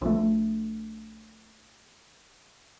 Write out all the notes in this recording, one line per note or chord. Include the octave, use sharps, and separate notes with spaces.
A#1 A3